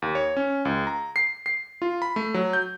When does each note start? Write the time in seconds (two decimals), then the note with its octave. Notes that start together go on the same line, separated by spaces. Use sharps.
0.02 D#2
0.15 C#5
0.36 C#4
0.65 C#2
0.87 A#5
1.16 C7
1.46 C7
1.82 F4
2.02 B5
2.16 A3
2.34 F#3
2.53 G6